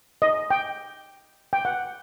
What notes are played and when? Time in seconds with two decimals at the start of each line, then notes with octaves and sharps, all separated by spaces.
0.22 D#5
0.50 G5
1.53 G5
1.65 F#5